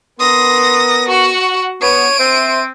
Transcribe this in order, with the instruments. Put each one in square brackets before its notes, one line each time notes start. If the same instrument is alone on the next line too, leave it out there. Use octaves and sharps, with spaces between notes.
[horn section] B3 A#4 [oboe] C6 [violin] D#6 A#6
[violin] F#4 F#5 [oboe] C#6
[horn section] B3 [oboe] C#5 [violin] D7 D#7
[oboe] C4 [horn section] C5 E5